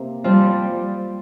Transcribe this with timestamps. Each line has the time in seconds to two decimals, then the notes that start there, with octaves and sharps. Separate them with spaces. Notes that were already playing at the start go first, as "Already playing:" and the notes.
Already playing: C3 A#3
0.24 F3 G3 C4 F4